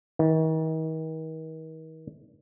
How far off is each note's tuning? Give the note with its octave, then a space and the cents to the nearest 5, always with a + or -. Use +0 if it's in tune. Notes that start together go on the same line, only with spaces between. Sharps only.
D#3 +40